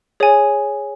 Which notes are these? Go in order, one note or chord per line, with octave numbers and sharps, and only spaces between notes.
G#4 C#5 G#5